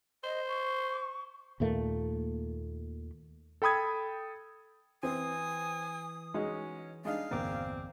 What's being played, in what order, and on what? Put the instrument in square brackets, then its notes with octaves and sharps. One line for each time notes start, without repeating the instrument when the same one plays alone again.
[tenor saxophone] C5 [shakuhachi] D#5
[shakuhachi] C#6
[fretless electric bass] D#2 A#2 A3 A#3
[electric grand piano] A4 G5 B5 D#6 G#6
[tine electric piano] E3 [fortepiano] C4 [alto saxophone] G#5 [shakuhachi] D#6
[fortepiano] G#3 D#4 F#4 [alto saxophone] C#4
[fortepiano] G#3 D4 D#4 [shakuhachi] F5
[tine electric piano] G1 E2 D6 [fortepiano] A#2 [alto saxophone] C4